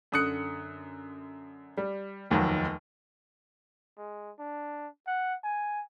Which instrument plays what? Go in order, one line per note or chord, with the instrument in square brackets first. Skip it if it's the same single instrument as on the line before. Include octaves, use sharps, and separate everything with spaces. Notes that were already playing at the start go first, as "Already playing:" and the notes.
[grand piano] F#2 D3 D#6 F#6 C#7
G3
F1 D#2 D#3 F3 F#3
[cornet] G#3
D4
F#5
G#5